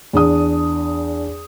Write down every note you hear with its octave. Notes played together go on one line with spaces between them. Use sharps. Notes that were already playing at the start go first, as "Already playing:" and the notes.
E2 D4 D#6